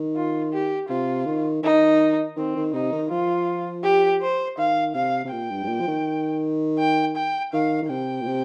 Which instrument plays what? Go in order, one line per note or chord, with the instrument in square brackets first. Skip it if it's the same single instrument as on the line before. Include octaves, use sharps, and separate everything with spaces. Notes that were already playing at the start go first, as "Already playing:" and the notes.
Already playing: [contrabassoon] D#3
[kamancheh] F4
G4
[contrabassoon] C3 [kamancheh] F4
[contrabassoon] D#3
[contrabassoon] D#3 [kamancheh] D#4
[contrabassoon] D#3 [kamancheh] C4
[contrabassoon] D#3
[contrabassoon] C3 [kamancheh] D#4
[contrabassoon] D#3
[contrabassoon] F3 [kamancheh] F4
[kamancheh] G4
C5
[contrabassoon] D#3 [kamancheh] F5
[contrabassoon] C3 [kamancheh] F5
[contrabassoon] C3
[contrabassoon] A#2 [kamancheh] G5
[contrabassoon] G2
G2
A#2
F3
D#3
[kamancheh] G5
G5
[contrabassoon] D#3 [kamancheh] F5
[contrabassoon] D#3
[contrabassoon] C3 [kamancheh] G5
[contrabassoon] A#2
C3